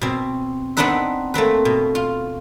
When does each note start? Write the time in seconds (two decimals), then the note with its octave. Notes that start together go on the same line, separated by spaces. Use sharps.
0.01 B2 C4
0.77 B3 C4 D4 D#4 B4 E5
1.34 A3 A#3 C4 B4
1.65 B2
1.95 F4